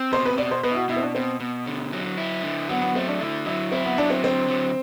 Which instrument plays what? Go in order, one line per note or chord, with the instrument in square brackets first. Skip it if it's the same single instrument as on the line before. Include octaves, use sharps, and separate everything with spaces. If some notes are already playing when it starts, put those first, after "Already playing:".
Already playing: [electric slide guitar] C4
[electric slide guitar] B2 [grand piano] C5
[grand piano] B4
[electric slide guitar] B2 [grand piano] D5
[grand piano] C5
[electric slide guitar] B2 [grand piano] B4
[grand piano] E4
F#4
[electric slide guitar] B2 [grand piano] E4
[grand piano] C4
D4
[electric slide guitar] B2 [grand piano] C4
[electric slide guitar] B2
D3
F#3
E4
D3
[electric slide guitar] F#3 [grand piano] B3
[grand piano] B3
[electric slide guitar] A3 [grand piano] C4
[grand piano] D4
[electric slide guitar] D3 [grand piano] E4
[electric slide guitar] F#3 [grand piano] E4
[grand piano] C4 [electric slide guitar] E4
[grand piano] B3
[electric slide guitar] F#3 [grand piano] D4
[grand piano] C4
[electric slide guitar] D3 [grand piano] C4
[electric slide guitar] F#3